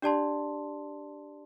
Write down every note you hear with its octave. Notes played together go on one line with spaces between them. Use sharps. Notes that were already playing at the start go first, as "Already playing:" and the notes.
D4 G4 D5 A5 C6